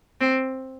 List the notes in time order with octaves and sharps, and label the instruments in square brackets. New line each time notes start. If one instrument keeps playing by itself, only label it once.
[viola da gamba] C4